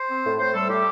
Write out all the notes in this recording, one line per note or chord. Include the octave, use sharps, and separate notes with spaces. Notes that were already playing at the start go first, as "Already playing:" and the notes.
Already playing: C5
C4
A2
A2 C5
G3 A4
A2 G4